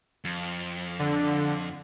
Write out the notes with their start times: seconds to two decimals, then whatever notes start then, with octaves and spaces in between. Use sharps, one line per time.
0.25 F2
0.99 D3